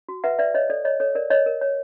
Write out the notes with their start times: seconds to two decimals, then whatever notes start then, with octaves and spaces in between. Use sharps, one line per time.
0.09 F#4
0.24 B4 E5 F#5
0.39 B4 D5 E5
0.55 C#5 D#5
0.70 A4 D5
0.85 C#5 D#5
1.00 A4 C#5
1.15 A#4 D5
1.30 A#4 C#5 D#5
1.46 A#4
1.61 C#5